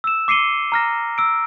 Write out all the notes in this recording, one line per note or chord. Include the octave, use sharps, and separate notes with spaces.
E6 E7
D6 C7 C#7 D#7 G7
A#5 F6 A#6
E6 D7